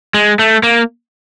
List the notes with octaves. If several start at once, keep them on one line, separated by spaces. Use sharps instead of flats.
G#3
A3
A#3